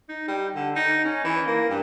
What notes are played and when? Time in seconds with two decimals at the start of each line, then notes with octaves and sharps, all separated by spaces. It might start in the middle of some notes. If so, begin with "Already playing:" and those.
0.09 D#4
0.28 G3
0.55 D3
0.76 D#4
1.05 C#4
1.24 E3
1.47 A#3
1.69 G2